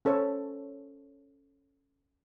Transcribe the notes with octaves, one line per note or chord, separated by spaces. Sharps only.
C#4 A4 C5 C#5